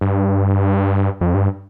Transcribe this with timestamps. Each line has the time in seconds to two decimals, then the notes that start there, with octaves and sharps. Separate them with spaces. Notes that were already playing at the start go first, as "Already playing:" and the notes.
0.01 G2
1.21 F2
1.35 G2